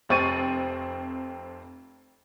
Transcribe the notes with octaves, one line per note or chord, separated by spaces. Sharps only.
F1 F2 C4 C#6 A6 D#7